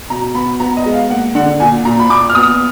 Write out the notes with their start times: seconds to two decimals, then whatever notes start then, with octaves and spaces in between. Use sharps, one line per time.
0.10 B2 A#5
0.35 B3 B5
0.60 B3 A#5
0.77 D#5
0.85 G#3
0.93 F5
1.10 A#3 F#5
1.35 D3 F#5
1.60 A#2 G#5
1.85 A#2 A#5
1.99 B5
2.10 A#2 D6
2.30 F6
2.35 B3 D#6